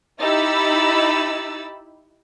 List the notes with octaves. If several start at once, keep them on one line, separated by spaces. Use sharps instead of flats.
D#4 E4 G4 B5 E6 A6